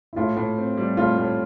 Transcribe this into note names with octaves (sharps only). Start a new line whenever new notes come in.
E4
A2 F4
A2
C4
G3
A2 F4
A2